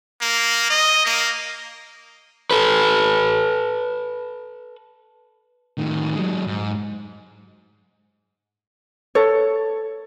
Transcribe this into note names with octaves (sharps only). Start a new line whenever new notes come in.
A#3
D#5
A#3
A4 B4
A2 D#3
F#3 G#3
G#2
A4 C#5